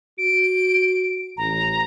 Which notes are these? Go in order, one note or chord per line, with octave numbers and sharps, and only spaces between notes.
F#4 D7
A1 A#5